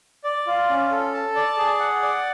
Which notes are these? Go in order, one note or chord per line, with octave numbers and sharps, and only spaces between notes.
D5
F4
C#4
A4
A5
D5
G#4
F#5
D5